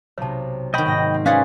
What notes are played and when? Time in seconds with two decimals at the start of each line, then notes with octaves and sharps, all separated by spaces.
0.18 B1 C3 C#5 A5
0.74 D#3 F#4 D#5 G5 B5
0.85 G#1 G#2 A#6
1.14 C4
1.26 C#4 F4 G#4 B4 D5 F5 F#5